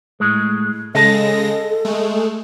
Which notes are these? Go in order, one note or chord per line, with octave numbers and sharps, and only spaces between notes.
A2 G#3
C#3 G#3 A4 D#5 A5 A#6
G#3 A3